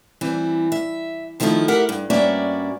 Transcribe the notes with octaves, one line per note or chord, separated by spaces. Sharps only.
E3 G3 C4
E5
D#3 F3 A3 C#4 E4 F4
G4 A#4 E5 F#5
G2
G2 A#3 C#4 F#4 D5 E5